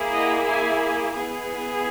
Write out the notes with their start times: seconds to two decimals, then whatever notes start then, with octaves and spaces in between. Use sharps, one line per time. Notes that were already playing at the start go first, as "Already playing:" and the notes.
Already playing: A#3 E4 G#4
0.13 D#5 F#5
0.47 E5 G#5
1.15 B3 E4 G#4